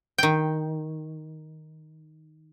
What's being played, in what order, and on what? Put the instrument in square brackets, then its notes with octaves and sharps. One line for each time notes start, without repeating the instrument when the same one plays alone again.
[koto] D#3 G5